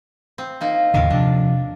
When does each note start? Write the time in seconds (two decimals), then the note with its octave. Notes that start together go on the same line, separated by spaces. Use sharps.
0.38 C4
0.61 A#3 D#4 F4
0.94 D#2 A2 D3 D#3 A#4 F5
1.10 C3 F3 D4